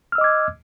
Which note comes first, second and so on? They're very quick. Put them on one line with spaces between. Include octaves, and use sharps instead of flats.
F6 E6 D#5 D6 G#6